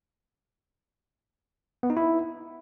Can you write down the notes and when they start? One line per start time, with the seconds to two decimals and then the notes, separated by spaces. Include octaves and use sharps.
1.83 B3
1.90 D#4
1.97 E4